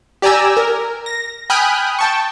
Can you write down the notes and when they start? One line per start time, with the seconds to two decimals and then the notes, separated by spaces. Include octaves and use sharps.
0.22 G4 D5 G#5 A#5 E6
0.57 A#4
1.06 A#6
1.50 G5 G#5 B5 D#6 F6 F#6
1.99 G5 A5 C#6